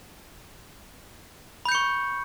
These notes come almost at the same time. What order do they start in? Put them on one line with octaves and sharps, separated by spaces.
B5 G6 C#7 C#6